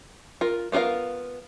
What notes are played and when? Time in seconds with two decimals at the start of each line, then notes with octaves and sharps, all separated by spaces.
0.41 F4 A#4
0.72 B3 F4 G#4 A#4 F5